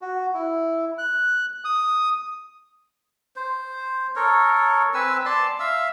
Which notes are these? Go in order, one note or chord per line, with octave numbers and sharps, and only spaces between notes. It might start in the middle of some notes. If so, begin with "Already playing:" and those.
F#4
E4
F#6
D#6
C5
A4 A#4 C#5
C4 B4 G#5 E6
D5 A5 C6
E5 F5 E6